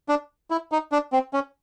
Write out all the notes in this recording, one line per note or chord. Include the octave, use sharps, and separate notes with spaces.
D4
E4
D#4
D4
C4
C#4